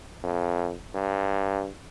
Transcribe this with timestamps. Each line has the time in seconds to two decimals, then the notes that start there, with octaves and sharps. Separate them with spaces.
0.23 F2
0.94 G2